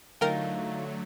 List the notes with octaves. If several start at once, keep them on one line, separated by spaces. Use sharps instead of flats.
D3 F#3 A3 D#4 F4 A#4 G5